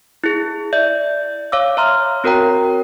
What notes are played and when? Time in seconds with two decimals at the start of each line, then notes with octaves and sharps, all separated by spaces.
0.24 E4 G#4
0.73 D5 E5 G6
1.52 C#5 F5 D6 E6
1.77 C#5 E5 A#5 C6 F6
2.24 C4 F#4 A#4 C#5 G5 A#5